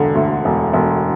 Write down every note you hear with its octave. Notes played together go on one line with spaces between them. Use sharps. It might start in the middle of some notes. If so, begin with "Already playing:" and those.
Already playing: E1 D3
D2
E1
E1